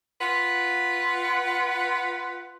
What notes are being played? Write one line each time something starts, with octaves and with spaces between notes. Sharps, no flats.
F4 B4 F#5